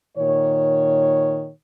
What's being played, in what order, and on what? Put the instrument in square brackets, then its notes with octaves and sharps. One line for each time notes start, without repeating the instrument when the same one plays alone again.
[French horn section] A#2 D#3 C#5